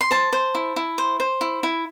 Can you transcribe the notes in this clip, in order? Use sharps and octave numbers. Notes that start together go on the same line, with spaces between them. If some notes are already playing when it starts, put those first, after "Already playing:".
C6
C5 A5
C5
E4
E4
C5
C5
E4
E4